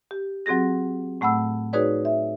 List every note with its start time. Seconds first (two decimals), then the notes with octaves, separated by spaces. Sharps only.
0.11 G4
0.46 F#3 C4 F#4 G#4 A#6
1.21 A2 A3 F#5 B5 E6
1.73 D#4 F#4 G#4 B4 C#5 D5
2.05 E5